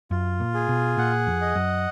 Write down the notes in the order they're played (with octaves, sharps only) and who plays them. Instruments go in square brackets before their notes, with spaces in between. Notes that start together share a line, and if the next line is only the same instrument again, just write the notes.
[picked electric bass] F#2 [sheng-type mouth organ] F4
[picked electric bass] A#2
[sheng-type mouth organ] G#4
[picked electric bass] B2
[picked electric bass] A#2 [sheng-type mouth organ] F#5
[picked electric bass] F2
[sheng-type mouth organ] D#5
[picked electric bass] F#2